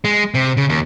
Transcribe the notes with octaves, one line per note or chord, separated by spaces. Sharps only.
G#3
C3
C#3
D#2